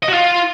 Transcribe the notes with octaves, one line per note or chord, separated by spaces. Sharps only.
D#5
F#4
F4